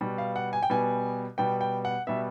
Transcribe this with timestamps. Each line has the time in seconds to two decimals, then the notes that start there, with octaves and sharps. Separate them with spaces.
0.01 B2 G3 B3
0.18 F5
0.36 F#5
0.53 G#5
0.63 G5
0.70 B2 G3 B3 G#5
1.38 B2 G3 B3 G5
1.61 G5
1.85 F#5
2.07 B2 G3 B3 E5